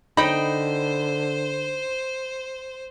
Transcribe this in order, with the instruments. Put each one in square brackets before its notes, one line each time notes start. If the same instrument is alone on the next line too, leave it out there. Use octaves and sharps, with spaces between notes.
[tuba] D3 [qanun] D#4 G5 [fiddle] C5 [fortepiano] B5